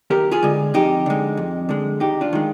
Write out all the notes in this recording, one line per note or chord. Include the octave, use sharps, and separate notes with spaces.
D#2 G4 A#4
F4 G#4
D3 G#3
F2 D#4 G4
D3 G#3
F2
D3 G#3
D#2 D#4 G4
D4 F4
D#3 G#3